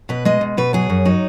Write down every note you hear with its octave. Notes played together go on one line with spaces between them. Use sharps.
B2 B4
G#3 D#5
B2
B2 B4
F#3 G#4
F#2
F#3 D#4